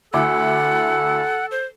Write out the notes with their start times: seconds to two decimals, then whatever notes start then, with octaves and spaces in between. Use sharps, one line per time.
0.14 D2 E4 A4 F#5 D6
1.51 C5